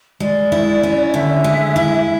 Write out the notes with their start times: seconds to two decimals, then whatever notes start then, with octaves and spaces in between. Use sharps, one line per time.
0.20 G#3 D5
0.52 E4
0.83 C#4
1.14 D3 E5
1.44 G#3
1.76 E4